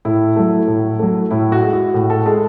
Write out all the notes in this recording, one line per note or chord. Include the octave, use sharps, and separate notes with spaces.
A2 E4
F#3 A3
A2
F#3 A3
A2 E4
F#4
G#3
F#4
A2
A4
G#3 A4